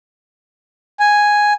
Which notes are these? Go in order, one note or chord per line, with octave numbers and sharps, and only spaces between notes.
G#5